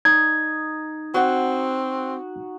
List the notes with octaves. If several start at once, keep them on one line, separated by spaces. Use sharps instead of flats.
D#4 G#6
C4 F#4 F#5